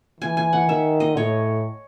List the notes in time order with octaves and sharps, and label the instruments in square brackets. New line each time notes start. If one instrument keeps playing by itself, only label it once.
[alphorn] E3 [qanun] G#5
[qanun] G#5
F#5
[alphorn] D#3 [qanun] E5
[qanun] D#5
[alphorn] A2 [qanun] C#5